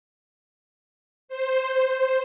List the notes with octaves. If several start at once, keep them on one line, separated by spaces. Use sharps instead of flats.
C5